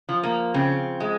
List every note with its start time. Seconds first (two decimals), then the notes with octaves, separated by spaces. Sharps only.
0.09 F3
0.23 A#3
0.54 C#3 C4
1.00 G#3